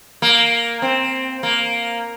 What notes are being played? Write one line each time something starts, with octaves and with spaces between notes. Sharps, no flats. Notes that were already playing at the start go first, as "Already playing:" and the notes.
A#3
C4
A#3